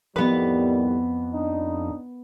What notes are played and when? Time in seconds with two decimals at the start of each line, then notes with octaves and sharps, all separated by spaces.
0.16 F2 A2 D#3 G3 B3 B4
1.33 D4 D#4